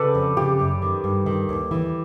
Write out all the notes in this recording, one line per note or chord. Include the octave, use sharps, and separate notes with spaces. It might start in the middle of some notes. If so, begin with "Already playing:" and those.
Already playing: C#3 G4 A4 B4 D5
F2
C#3 G4
F#2
D#3
G2
D#3
D#2
E3